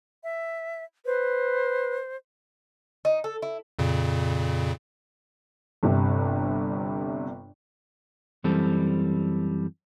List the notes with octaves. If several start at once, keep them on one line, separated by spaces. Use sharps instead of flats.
E5
B4 C5
D#4
A4
E4
F2 A#2 C#3
G1 G2 C3
F#2 E3 G3 C4 A4